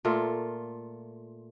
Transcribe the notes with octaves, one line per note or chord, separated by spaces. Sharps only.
A#2 A3 F4 A#4